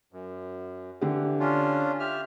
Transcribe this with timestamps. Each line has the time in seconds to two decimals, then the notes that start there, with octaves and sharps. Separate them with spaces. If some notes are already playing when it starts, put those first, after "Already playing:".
0.13 F#2
1.01 D3 E3 G4
1.40 C#4 D4 F4
2.00 G4 E5 F6